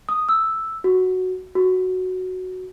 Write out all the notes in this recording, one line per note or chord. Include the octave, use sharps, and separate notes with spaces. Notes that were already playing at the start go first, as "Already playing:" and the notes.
D#6
E6
F#4
F#4